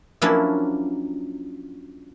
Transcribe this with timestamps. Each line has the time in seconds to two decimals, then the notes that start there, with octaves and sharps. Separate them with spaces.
0.22 F3 F#3 A#3 C#4 D4 E4